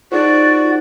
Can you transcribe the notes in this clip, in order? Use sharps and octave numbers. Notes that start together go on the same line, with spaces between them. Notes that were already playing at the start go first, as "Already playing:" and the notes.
D#4 F4 F#4 G#4 C5 D5